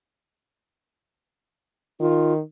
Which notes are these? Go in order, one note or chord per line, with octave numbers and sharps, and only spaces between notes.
D#3 F4